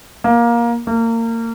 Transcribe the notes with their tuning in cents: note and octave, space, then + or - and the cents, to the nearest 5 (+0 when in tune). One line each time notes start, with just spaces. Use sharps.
A#3 +15
A#3 -30